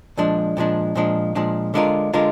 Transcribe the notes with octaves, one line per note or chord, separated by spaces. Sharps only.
A#2 F3 G#3 D4
A#2 F3 G#3 D4
A#2 F3 G#3 D4
A#2 F3 G#3 D4
D3 G#3 D4 F4 A#4
D3 G#3 D4 F4 A#4